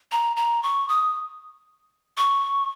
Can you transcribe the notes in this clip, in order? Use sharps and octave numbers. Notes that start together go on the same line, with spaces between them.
A#5
A#5
C#6
D#6
C#6